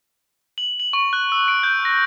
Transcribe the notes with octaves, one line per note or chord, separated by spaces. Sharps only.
F#7
F#7
C#6
F#6
E6
D7
G6
A#6